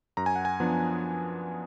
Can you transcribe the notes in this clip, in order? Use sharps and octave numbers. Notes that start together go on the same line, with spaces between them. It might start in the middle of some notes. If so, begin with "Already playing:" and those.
F#2 A#5
G#5
F#5
G#5
F3 B3 D4